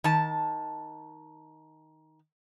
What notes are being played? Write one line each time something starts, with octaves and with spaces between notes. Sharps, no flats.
D#3 A5